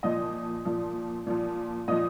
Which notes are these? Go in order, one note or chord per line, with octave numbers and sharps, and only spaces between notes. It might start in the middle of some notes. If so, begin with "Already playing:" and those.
A#2 F3 D#5 D#6
A#2 F3
A#2 F3
A#2 F3 D#5 D#6